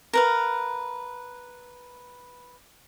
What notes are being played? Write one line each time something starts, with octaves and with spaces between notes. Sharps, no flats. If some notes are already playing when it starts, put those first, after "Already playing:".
A#4 B4 F5